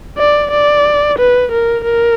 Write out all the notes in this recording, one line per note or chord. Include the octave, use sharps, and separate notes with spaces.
D5
D5
B4
A#4
A#4